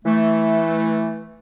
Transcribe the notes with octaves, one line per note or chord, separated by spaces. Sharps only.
E3 A3